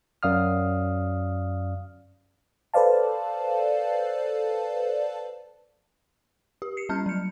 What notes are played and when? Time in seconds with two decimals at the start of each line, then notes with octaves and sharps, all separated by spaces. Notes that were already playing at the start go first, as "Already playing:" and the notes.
0.23 F#2 D5 F5 D#6 F6
2.74 A4 B4 C5 D5 F5 A5
6.62 G4
6.77 C7 C#7
6.89 G3 C#4 F6 G6
7.06 F#3 C#7